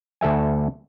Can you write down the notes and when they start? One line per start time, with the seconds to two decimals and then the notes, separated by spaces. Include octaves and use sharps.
0.21 D2 A4 E5 G#5